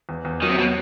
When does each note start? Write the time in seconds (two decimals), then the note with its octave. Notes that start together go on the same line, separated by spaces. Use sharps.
0.09 E2
0.25 E2
0.42 D#3 F#3
0.50 C3
0.58 B2 F#3